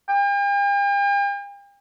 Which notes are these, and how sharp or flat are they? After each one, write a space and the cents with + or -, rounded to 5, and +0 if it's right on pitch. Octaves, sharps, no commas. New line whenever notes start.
G5 +45